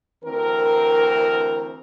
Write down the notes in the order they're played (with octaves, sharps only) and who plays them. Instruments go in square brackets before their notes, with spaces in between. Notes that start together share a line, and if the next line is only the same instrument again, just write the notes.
[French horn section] D2 E3 C4 A#4